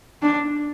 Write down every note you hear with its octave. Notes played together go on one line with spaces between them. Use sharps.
D4